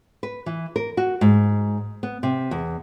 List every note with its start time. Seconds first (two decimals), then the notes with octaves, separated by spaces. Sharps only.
0.23 B4
0.46 E3
0.76 A#4
0.97 F#4
1.21 G#2
2.03 B3
2.23 C3
2.51 E2